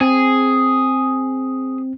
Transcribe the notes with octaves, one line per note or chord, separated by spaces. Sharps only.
C4 G#4